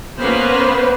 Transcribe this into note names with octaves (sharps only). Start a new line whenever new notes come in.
A#3 B3 C#4 B4 C5